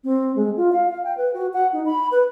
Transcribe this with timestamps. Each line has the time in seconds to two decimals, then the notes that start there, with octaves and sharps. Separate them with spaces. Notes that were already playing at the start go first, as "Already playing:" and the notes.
0.04 C4
0.36 G#3
0.57 F4
0.72 F5
0.90 F5
1.04 G5
1.17 B4
1.34 F#4
1.53 F#5
1.73 D#4
1.86 B5
2.11 B4